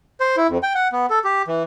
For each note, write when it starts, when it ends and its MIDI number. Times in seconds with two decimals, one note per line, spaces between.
0.20 0.36 72
0.37 0.47 64
0.49 0.58 41
0.63 0.73 79
0.75 0.88 78
0.92 1.06 59
1.10 1.19 69
1.24 1.42 67
1.48 1.63 52